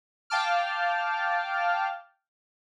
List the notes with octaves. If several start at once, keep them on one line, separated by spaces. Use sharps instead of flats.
F5 G5 A5 D6 F6